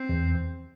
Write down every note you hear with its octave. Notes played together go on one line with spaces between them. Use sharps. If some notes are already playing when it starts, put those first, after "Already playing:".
Already playing: C4
E2